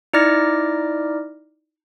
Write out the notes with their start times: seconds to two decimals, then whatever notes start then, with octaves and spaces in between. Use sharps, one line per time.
0.13 D#4 E4 D5 D6 F6 A#6